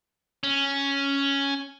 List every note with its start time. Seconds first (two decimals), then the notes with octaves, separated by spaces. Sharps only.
0.44 C#4